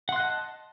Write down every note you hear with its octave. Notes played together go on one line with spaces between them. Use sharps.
D#5 F#5 A5 C6 F#6